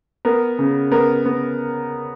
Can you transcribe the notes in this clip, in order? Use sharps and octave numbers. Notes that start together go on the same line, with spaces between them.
B3 A#4
C#3
B3 A#4
B3